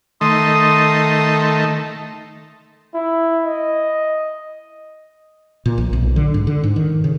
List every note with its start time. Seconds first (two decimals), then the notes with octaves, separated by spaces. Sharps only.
0.21 D#3 A3 C6 D#6
2.94 E4
3.45 D#5
5.66 A#2
5.78 A#1
5.93 B1
6.16 D3
6.34 G#2
6.47 D3
6.64 G#2
6.76 D#3
7.04 C#3